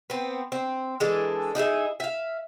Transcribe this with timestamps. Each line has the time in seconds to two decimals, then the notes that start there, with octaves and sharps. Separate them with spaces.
0.10 B3 C4
0.52 C4
1.00 E3 G#3 D4 A4
1.55 D#4 E4 G#4 E5
2.00 E5 F5